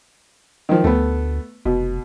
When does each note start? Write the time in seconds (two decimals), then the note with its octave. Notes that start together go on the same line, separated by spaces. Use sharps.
0.69 D#3 F3
0.84 D2 A3 B3
1.65 F1 B2